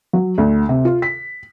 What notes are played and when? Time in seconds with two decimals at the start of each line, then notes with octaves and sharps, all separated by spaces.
0.13 F#3
0.38 D2
0.69 C3
0.85 F4
1.02 B6